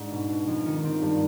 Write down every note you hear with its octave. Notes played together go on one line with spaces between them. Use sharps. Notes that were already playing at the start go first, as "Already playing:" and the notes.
Already playing: G#2 D4
B2
B2
F2
D#3
C4
G2